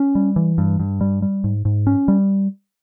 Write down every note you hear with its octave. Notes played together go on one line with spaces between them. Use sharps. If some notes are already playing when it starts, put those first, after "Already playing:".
Already playing: C#4
G3
E3
G2
G2
G3
G3
G#2
G#2
C#4
G3